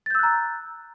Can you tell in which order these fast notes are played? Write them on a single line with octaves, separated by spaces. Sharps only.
A6 G6 E6 F#6 A#5